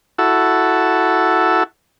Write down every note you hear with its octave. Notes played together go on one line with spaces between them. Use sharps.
E4 F#4 A4